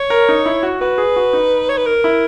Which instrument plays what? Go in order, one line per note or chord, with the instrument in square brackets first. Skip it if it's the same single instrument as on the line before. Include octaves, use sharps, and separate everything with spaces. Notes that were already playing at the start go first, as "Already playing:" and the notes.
Already playing: [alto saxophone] C#5
[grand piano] A#4
D#4
E4
F#4
[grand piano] F#4 [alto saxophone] B4
[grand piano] G#4
F#4
D#4
[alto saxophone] C#5
B4
A#4
[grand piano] E4